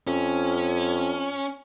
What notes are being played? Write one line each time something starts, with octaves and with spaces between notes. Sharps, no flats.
F2 C#4